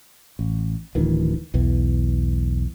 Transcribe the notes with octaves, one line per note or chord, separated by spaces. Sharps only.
A1
D1 D2 D#3 E3
B1 E2 E3